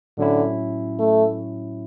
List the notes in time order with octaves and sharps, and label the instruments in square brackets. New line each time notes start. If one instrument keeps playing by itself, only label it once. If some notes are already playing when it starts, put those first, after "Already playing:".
[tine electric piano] A2 F#3 C#4 E4 [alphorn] D3
[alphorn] A3